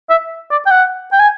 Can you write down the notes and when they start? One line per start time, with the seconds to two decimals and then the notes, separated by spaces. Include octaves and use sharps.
0.10 E5
0.51 D5
0.66 G5
0.71 F#5
1.12 G5
1.20 G#5